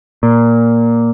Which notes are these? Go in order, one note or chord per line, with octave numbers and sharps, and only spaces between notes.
A#2